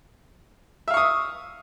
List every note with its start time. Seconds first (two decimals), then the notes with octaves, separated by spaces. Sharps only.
0.88 E5
0.91 F5
0.94 C#6
0.97 D#6